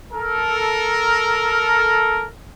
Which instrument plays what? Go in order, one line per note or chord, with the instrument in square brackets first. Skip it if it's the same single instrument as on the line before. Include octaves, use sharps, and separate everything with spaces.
[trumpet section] A4 A#4